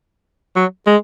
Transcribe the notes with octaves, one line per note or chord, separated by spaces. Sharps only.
F#3
G#3